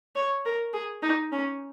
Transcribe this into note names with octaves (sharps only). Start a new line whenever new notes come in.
C#5
A#4
G#4
D#4
C#4